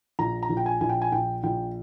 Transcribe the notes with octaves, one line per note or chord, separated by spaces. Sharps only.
A#1 A#5
A#5
A#1
G5
G#5
A#1 G#5
G5
G#5
A#1 G5
A#1 G5